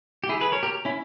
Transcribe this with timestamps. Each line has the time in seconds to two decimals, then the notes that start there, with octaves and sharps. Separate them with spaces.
0.24 G4
0.29 E4 G#4
0.41 G#4 B4
0.52 A#4 C#5
0.63 G4 A#4
0.85 C#4 E4